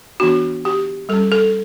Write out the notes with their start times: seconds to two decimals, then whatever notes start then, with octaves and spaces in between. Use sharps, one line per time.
0.20 E3 B3 D4 F#4
0.65 G4
1.09 G3 C#4 A4
1.32 A4